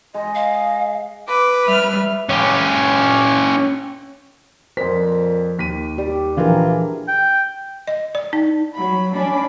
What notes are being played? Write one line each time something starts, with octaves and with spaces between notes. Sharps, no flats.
G#3 D#5
F5
B4 D6
G3 E5 F6
C#4 G4
F2 A#2 C5 B6
D#2 B6 D#7
G3 G4
A#1 E3 D4 F4 G#4 A#4
G5
D#5
D5
D#4
F#3 B5
C#4 D4 B5